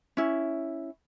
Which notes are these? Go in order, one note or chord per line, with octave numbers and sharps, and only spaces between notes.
C#4 E4